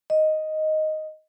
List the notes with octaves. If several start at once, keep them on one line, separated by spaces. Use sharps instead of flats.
D#5